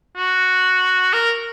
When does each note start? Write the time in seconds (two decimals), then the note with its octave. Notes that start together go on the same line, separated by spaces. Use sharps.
0.17 F#4
1.13 A#4